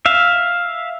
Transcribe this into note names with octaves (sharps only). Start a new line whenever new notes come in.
E5 F5